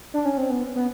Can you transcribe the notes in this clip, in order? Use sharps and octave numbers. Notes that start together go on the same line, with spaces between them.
D4
C#4
C4
B3
B3